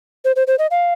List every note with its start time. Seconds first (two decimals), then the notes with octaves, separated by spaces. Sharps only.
0.25 C5
0.36 C5
0.47 C5
0.59 D#5
0.71 F5